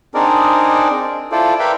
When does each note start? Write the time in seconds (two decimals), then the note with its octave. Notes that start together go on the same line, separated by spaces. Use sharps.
0.15 C4 D4 D#4 G#4 A#4 D5
1.32 E4 F4 A4 C5 D5
1.59 A#4 B4 D5 E5 F5 G5